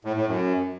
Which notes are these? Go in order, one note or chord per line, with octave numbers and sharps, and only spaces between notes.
A2
A2
F#2